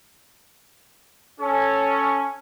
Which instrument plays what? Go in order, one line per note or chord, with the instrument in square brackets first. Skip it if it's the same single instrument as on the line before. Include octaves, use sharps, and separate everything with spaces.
[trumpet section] C#4 [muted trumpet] A4